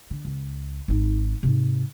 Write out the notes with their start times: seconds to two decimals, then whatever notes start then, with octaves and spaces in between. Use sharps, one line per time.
0.11 D3
0.25 C#2
0.88 G#1 D#4
1.43 G#2 C3